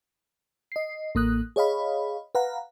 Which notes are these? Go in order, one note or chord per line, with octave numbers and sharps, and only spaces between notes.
D#5 C7
A1 A#3 D#6 F#6
G#4 C#5 D#5 F5 B5
B4 F5 F#5 A#5